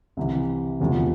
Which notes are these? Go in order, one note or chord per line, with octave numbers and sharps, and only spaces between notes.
C2 C3 E3
E1 D2 C3 F3